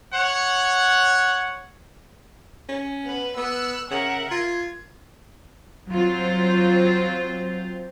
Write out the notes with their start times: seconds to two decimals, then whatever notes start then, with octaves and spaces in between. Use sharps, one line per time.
0.14 C#5 F#5
2.69 C#4
3.06 B3 B4
3.37 B3 E6 F#6
3.91 C#3 A#4 E5 F#5
4.31 F4 G#6
5.91 F#3 C4 F4 C5